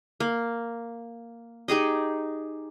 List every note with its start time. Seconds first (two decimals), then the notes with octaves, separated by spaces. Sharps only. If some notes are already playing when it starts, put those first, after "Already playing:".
0.20 A#3
1.68 D#4 G4 G#4 D#5